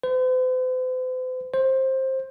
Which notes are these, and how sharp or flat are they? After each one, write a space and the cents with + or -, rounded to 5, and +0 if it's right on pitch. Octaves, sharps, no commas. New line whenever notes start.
C5 -45
C5 +15